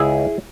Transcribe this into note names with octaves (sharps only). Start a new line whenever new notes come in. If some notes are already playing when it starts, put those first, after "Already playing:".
Already playing: C#2 E4 G#4